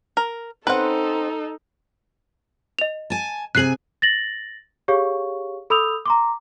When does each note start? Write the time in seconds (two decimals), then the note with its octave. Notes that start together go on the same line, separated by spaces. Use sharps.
0.17 A#4
0.67 C4 C#4 D#4 A4 B4 C5 F#5
2.79 D#5 F7
3.10 G#5 A5
3.55 C3 G#4 G#5 F#6 C7 F#7
4.02 A6 A#6 F#7
4.88 G4 G#4 C#5 F5 C#6
5.70 A4 B5 D#6 E6 G6 F7
6.06 A#5 C6 D6